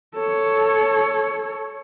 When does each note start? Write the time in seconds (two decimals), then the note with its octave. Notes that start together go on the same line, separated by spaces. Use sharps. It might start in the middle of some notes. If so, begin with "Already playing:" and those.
0.15 A4 C#5